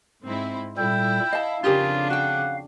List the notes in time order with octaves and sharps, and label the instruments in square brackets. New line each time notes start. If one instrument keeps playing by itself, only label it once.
[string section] G#2 C4 E4
[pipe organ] A#2 G3 A4 [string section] E4 [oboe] G5
[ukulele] D#5 A5 [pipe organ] F5
[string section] F2 C#3 D4 [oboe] F4 [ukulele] G4 G#4 A#4
[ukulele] F#4 G5 [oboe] F#5